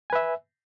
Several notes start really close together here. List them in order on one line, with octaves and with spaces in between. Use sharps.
G#5 B4 E5